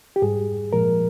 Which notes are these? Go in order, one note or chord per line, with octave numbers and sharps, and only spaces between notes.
G4
G#2 G3 G#4
A#2 F3 G#3 A#4